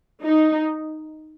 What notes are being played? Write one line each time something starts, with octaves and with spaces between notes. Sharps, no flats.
D#4